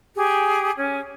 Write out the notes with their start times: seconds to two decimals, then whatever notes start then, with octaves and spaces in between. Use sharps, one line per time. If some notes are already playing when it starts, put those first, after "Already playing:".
0.15 G4 G#4
0.77 C#4